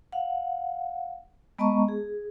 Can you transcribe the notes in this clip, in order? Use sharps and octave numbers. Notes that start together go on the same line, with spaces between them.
F5 F#5
G#3 B3 D#5 A5 A#5 C#6
G#4